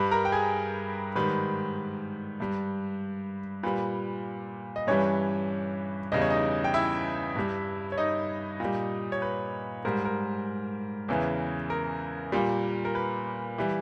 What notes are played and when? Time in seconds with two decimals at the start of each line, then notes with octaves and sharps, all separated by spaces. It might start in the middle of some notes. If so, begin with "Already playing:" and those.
Already playing: G2 G3 B4 B5
0.11 A#4 A#5
0.25 G5
0.32 G#4 G#5
1.16 G#2 D#3 G3 B4
2.40 G2 G3
3.63 A#2 G3 B4
4.76 D#5
4.87 G2 E3 G3 C#4 C#5
6.12 E2 C#3 G3 D#5
6.22 C#5
6.30 D#4 D#5
6.64 G5
6.74 E4 E5
7.35 G2 G3
7.92 C#5
7.98 D#4 D#5
8.60 A#2
8.65 G3
9.12 C#5
9.22 B4
9.85 G#2 G3 A#4
10.05 A#4
11.08 E2 C#3 E3
11.70 A#4
12.32 A#2 G3
12.85 A#4
12.95 B4
13.58 E3 G3